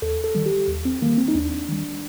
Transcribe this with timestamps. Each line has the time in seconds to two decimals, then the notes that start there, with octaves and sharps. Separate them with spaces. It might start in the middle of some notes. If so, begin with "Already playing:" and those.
0.02 D#2 A4
0.24 A4
0.35 D#3 G3
0.46 G4
0.68 D#2
0.85 C4
1.02 D#3 G3 A#3
1.18 C4
1.28 D#4
1.34 D#2 D4
1.68 D#3 G3